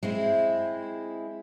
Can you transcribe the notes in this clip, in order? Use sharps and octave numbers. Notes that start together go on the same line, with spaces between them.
G#3 C4 E4